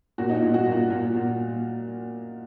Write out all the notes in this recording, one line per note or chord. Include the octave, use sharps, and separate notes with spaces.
A#2 F#4
D#4
F4
A#2
F4
F#4
A#2
F4
A#2 F4
A#2